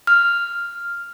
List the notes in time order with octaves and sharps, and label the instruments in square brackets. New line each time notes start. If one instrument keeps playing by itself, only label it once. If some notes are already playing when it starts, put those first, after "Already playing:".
[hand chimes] F6